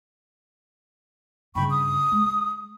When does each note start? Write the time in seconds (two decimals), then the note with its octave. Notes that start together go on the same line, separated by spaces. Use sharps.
1.55 G2 C#3 G5 B5 C#6
1.70 D#6
2.12 G#3